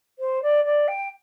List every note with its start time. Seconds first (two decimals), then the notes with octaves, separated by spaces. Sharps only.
0.19 C5
0.42 D5
0.65 D5
0.88 G5